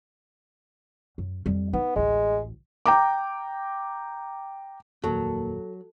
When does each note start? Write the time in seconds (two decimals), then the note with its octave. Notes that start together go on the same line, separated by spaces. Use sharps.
1.18 F#2
1.46 F2 G3
1.73 B3 D#4
1.96 A1 D2 G#3
2.86 G5 A#5 D6
5.04 F1 D#2 A#2 F#3 A#3 A4